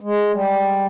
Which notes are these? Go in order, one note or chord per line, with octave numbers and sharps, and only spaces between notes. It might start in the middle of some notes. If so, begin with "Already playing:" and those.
G#3
G3